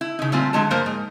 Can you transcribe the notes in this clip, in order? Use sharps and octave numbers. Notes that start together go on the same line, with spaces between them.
E4
C#3 D#4
A#2 G3 A3 C4 F4 G#5
A2 D3 F#3 G#3 C#5 A5
G2 F3 A#3 A#4 C5
G#2